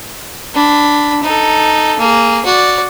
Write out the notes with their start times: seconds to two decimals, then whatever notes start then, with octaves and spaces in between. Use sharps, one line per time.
0.55 D4 B5
1.23 D#4 A4
1.99 A#3 G#4
2.45 F#4 D5